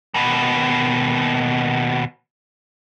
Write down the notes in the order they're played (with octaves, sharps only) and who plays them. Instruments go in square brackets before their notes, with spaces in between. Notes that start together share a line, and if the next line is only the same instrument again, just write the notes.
[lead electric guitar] D#2 B2